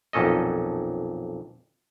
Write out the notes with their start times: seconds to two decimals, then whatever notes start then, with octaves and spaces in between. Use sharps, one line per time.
0.13 B1 F2 A#2 C#4 A4 D#5